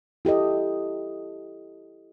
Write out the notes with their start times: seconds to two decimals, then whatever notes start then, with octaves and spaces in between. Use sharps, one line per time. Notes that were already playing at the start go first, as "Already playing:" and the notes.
0.25 E4 G4 A4 D#5